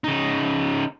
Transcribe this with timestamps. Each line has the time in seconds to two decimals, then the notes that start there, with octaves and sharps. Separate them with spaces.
0.04 C#3 D#4